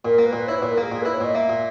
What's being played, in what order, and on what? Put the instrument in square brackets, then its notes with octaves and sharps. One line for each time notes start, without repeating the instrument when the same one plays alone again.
[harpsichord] A#2 [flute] A#4
[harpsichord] A#3
[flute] B4
[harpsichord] A#2
[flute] B4
[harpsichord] E4 [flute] C#5
[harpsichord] A#2 [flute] B4
[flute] A#4
[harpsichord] A#3 [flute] G#4
[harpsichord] A#2 [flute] G#4
[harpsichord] E4 [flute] B4
[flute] C#5
[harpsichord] A#2 [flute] D#5
[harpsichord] A#3 [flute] E5
[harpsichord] A#2